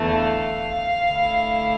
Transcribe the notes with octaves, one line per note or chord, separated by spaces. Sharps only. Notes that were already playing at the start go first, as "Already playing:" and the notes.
Already playing: E2 D3 A3
F5
D3 A3 E4